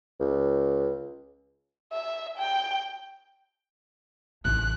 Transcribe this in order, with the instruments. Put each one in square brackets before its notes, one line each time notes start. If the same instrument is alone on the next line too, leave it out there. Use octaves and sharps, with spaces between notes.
[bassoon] C#2
[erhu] E5
G5
[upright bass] A1 D#4 [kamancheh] F#6